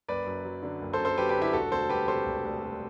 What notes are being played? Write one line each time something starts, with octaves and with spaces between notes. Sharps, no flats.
F#1 B4 D5
F#2
F#3
D3
F#1
A4 C5
F#2
A4 C5
F#3 G4 B4
G4 B4
D3
E4 G4
E1 F#4 A4
D2 A4 C5
G3 G4 B4
C3 A4 C5
E1
D2
G3